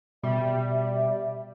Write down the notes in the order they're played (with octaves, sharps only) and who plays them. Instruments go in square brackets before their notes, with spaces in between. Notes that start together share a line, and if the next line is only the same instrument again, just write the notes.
[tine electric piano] B2 [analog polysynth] G3 [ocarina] E5